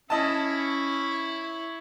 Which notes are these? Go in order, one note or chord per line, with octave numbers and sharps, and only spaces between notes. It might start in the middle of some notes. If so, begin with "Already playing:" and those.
C#4 E4 C#5 D#5 A5